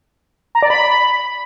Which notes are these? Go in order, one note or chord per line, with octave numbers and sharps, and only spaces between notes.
A#5
D5
B5